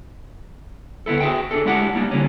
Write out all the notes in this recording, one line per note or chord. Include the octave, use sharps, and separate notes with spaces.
D2 B3 E4 A4
F#4 G#4 E5 G5
D4 G#4 A4
G#3 A3 D4 E4 G4 F#5
G3 A#3 D4 D#4
D3 E3 G3 A#3 C#4